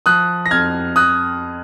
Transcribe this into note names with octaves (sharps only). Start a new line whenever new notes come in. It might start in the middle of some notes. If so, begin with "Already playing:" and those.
F3 D#6 F#6
A#6
F2 F6 G#6
D#6 F#6